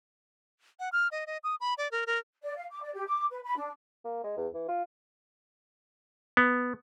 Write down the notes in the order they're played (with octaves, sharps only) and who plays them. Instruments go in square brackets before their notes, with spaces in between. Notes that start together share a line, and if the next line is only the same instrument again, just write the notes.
[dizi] F#5
F6
D#5
D#5
D#6
B5
D5
A#4
A#4
[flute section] D5
F5
D6
D5
G4
D6
B4
B5
D4
[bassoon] A#3
G#3
E2
E3
F4
[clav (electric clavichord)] B3